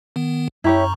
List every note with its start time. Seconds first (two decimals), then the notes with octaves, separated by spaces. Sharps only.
0.16 D#3 B3
0.64 F#2 E4 G4 C#5 A#5 C#6